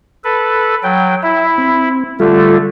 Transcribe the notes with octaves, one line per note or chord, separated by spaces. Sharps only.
A4 B4
F#3 G5
E4 E5
C4
D3 G3 A3 F4 A4